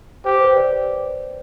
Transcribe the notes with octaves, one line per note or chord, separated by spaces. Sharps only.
G4 C5
C5
B4
D5